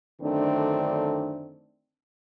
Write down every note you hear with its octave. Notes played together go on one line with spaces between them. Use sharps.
F#2 D3 D#3 A3 C4 D4